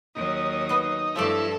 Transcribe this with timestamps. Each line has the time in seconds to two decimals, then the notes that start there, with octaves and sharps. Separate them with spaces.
0.15 D#2 F#3 D#4
0.69 B3 D#5
1.16 G2 F3 A3 E4 A4 D5